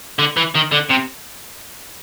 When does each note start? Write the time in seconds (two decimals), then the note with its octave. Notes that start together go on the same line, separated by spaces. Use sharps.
0.19 D3
0.37 E3
0.55 D#3
0.72 D3
0.89 C3